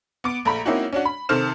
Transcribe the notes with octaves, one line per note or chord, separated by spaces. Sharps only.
B3 D6 D7
A#1 A3 A#5 B5
A#3 C4 C#4 D#4 E4 F#4
C#4 D4 F#4
B5
C3 D#3 A4 C5 F6 E7